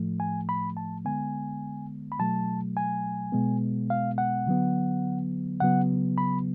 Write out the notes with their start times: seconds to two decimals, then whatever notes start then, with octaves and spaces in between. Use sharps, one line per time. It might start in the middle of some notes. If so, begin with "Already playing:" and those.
Already playing: A2 F3 A3
0.20 G#5
0.49 B5
0.77 A5
1.05 D3 G#3 B3 G#5
2.12 B5
2.19 B2 F#3 A3 A5
2.77 G#5
3.32 B2 G#3 B3
3.90 F5
4.18 F#5
4.46 D3 F#3 B3
5.60 C#3 F#3 B3 F#5
6.18 B5